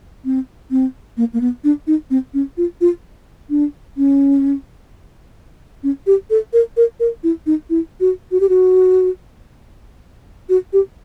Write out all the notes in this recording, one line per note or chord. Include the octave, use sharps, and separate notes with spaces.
C4
C4
A#3
A#3
B3
D4
D#4
C4
C#4
F4
F4
D4
C#4
C#4
G4
A4
A#4
A#4
A#4
E4
D#4
E4
F#4
F#4
G4
F#4
F#4
G4